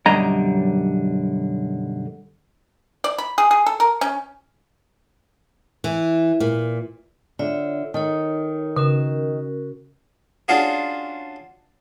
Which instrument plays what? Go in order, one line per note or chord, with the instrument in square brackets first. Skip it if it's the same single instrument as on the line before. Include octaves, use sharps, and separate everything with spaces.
[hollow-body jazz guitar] B1 F#2 D3 G3 D#5 A#5
[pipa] D5
B5
G#4
G#4
A4
A#4
C#4
[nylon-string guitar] E3
A#2
[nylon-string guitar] D3 [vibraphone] F4 C#5 E5
[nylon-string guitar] D#3 [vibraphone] D#4 A4 C#5
[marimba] C#3 [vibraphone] C#4 F#4 A#4
[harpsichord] C#4 D4 F4 F#4 G#4